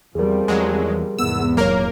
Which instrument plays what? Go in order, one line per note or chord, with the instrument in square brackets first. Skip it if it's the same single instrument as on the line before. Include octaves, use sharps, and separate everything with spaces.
[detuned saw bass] E2 [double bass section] F3 G3 C4 [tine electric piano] G#4 A#4
[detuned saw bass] E2 [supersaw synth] F#3 G#3
[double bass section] E2 G#2 C3 [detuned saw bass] B3 [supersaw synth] E6
[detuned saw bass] D#1 [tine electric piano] F#3 C#5 [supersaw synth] A#3 A#4